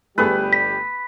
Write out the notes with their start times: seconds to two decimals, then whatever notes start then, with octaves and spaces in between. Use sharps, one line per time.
0.18 G1 G3 A3 B3 G4 G#4 B4
0.53 B6